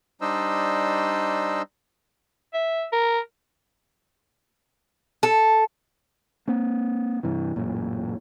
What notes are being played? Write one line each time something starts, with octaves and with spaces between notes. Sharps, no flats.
G3 D4 D#4 C5 D#5 E6
E5
A#4
A4
A#3 C4
G2 C3 E3
A1 F#2 A#2